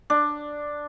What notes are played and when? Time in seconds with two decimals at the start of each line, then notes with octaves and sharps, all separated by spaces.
0.10 D4